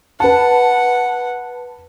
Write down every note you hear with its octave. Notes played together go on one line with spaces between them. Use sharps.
B4 F#5 A5